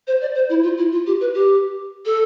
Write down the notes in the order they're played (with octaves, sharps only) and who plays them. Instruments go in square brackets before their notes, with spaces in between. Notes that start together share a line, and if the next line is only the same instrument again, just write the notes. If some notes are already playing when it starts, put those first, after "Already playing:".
[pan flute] C5
D5
C5
E4
F4
E4
F4
G4
B4
G4
A4